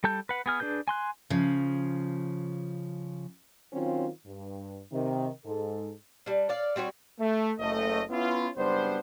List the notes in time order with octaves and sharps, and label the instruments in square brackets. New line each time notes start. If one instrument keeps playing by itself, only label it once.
[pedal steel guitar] G3 A4 A5 G6
B4 F#5
B3 G#4 F6
D4 G#4 B4 G6
G#5 C6 F#6
[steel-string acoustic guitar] C#3 F3
[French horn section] D#3 F#3 C4 C#4 F4
G2
C3 D#3
G#2 A4
[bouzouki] G3 D4
C#5 D5 F5
G3 C4 F#4 C#5
[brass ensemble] A3
F#1 A3 D#5
B3 C#4 E4 F4
F#1 G3 B3 D4 C5